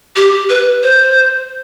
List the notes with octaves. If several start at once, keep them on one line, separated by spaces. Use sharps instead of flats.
G4
B4
C5